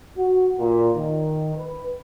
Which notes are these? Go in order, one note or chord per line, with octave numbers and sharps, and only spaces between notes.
F#4
A#2
D#3
B4